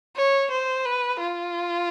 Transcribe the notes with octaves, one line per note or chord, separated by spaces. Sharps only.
C#5
C5
B4
F4